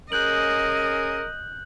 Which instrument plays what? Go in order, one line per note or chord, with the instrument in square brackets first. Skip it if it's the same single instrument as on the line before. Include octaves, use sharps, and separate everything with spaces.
[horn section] C#4 G#4 A#4 [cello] D#5 [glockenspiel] F#6 G6 F#7